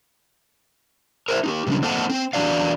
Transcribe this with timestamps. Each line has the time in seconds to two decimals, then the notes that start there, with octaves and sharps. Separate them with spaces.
1.28 A#4 C5 E5
1.44 D#4 F#4 G4
1.67 A2 C#3 F#3 G3 D4
1.82 A#3 C4 D#4 A4 F#5 A5
2.10 C4 C5
2.33 E2 D#3 D4 F#4 D5 F5